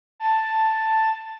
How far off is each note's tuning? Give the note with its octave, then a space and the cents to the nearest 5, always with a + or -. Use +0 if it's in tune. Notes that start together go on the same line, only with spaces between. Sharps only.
A5 +5